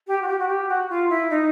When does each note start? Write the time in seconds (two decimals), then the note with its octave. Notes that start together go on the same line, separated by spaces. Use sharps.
0.07 G4
0.22 F#4
0.28 G4
0.39 F#4
0.48 G4
0.69 F#4
0.89 F4
1.10 E4
1.30 D#4